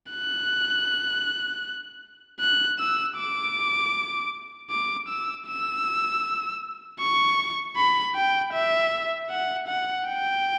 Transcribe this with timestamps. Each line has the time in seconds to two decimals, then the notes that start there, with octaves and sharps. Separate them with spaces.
0.11 F#6
2.40 F#6
2.79 E6
3.17 D6
4.70 D6
5.08 E6
5.46 E6
7.00 C#6
7.77 B5
8.15 G5
8.53 E5
9.30 F#5
9.67 F#5
10.07 G5